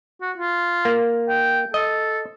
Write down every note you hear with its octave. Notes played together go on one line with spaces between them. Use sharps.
F#4
F4
A#3
G5
A4 D#5